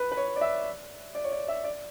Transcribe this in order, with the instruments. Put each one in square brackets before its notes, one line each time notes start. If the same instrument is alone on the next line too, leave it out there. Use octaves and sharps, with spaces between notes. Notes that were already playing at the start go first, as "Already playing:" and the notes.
Already playing: [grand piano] B4
B4
C#5
D5
E5
D5
C#5
D5
E5
D5